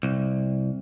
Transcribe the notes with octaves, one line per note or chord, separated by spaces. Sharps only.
C2